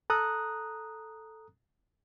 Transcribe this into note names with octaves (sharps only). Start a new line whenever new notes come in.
A4 A#5 D#6 F#6